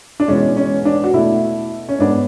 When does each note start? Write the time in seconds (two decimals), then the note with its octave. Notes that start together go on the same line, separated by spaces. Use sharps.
0.20 D4
0.28 E2 B2 G#3 B3 C#4
0.57 C#4
0.85 D4
1.04 F#4
1.14 B2 A3 E4
1.89 C#4
1.99 G#2 G#3 B3 D4